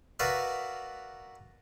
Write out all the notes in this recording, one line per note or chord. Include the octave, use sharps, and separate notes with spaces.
F#4 A#4 B4 D5 E5 F5